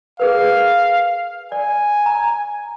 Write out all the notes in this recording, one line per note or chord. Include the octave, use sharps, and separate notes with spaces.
G#4 A#4 B4 F5
D5 G#5
A#5